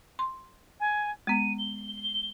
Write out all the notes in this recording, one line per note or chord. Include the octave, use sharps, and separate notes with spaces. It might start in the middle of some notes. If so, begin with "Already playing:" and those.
C6
G#5
G#3 B3 D#7
G7